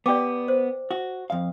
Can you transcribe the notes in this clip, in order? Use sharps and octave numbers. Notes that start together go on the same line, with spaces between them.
B3 G4 D5 G5 D6
C5
F#4
F2 F5